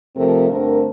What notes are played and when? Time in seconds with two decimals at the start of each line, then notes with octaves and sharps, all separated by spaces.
0.15 F2 C3 F3 A3 C4 A#4
0.49 G2 D3 A3 C4 A#4